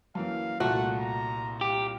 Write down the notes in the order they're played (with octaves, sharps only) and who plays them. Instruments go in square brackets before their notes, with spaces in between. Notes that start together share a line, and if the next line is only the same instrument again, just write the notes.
[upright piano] F#2 E3 A#3 [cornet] F5
[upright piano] C2 A#2 [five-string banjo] A3 F#4 [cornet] F#5
[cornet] A#5
[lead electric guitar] G4 [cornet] F5